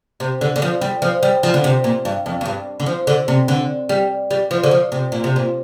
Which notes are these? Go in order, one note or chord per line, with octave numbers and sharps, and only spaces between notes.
C3
D3
D3
F3
G3
F3
G3
F3
D3
C3
A#2
G2
F2
F2
G2
D3
F3
D3
C3
D3
G3
G3
F3
D3
F3
C3
A#2
C3
A#2